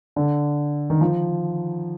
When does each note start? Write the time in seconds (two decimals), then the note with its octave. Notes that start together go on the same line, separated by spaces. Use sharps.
0.16 D3
0.90 D#3
1.01 F3